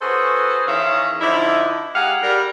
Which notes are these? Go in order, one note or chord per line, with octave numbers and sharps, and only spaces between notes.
C#4 F#4 G#4 A4 B4 C5
D#3 E3 C#4 G#4 E5 F5
D3 F3 D#4 E4
G#3 D#4 G4 F5 F#5
G3 A#4